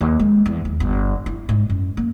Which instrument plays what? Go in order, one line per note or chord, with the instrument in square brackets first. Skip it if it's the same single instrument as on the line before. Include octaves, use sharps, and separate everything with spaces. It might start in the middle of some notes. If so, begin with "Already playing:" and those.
[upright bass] D#2
G#3
E2
D#2
G1
E4
G#2
F#2
A#3